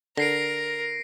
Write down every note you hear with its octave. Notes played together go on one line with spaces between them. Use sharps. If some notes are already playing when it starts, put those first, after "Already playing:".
D3 A#4 A#6 C7 D7